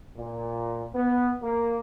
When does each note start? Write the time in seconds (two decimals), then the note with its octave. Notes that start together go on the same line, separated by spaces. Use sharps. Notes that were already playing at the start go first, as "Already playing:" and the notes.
0.17 A#2
0.94 B3
1.43 A#3